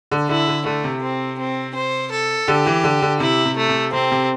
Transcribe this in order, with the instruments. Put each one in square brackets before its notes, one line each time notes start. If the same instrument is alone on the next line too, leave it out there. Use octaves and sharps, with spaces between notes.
[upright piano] D3
[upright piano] D3 [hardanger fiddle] E4
[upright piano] D3
[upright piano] D3 [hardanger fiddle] A3
[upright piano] C3
[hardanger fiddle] C4
C4
C5
A4
[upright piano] D3 [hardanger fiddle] G4
[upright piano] E3
D3
D3
[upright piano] C3 [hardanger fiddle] E4
[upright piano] C3
[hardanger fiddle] A3
[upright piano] C3
[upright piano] C3 [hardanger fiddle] C4
[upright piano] C3